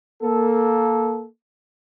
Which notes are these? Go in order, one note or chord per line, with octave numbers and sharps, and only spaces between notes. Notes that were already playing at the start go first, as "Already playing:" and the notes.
A#3 A4